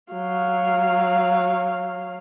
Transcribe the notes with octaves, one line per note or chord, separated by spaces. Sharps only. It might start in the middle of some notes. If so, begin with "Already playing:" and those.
F#3 F5